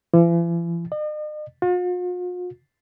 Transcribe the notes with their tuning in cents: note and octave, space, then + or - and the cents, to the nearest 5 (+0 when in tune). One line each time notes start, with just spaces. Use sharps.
E3 +45
D#5 -45
F4 +45